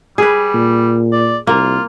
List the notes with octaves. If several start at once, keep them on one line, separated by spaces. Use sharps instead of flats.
G3 G#4 B4
A#2
D5
C2 A#3 F4